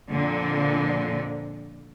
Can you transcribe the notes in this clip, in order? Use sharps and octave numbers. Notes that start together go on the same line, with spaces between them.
F2 A#2 D3